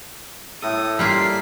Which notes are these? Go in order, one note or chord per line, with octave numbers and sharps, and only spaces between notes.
A2 A4 D#6
G3 A#3 F4 B6 C7